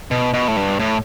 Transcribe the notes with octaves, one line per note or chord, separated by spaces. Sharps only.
B2
B2
A2
G2
A2